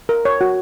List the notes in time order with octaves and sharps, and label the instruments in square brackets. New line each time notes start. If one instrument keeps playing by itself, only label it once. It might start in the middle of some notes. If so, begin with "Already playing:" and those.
[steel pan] A#4
C#5
F#4